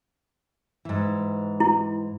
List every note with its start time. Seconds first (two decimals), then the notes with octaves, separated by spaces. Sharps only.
0.85 G#2 E3
1.60 E4